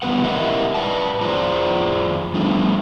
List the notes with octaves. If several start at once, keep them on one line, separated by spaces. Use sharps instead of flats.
E3 G3 B3 A4 B4 F#5
E4 G4 A#4 D#5 E5 F#5
B4 D5 A5
F2 F4 G#4 C5 D5 A#5
F3 G3 A3 B3 D4